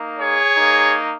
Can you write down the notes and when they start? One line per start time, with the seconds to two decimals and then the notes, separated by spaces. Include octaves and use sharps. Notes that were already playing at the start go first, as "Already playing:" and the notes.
Already playing: A#3 D#4
0.19 G#4 C#5
0.56 A#3 D#4